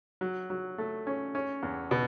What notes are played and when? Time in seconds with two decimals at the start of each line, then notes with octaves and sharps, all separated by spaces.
0.21 F#3
0.50 F#3
0.78 A3
1.07 C#4
1.35 C#4
1.63 E2
1.91 B2